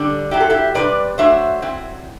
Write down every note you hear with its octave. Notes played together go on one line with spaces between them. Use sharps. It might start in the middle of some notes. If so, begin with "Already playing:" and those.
Already playing: D3 G3 D4
F#3 C4 E4 G4
A4
E4 G4
C3 G3 D4 B4 D5
F#3 A3 D4 C5 E5
F#3 C4 E4